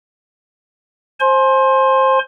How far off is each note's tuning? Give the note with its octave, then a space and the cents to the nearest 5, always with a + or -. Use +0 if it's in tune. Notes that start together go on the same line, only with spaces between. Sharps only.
C5 +15 G#5 +35 C6 +20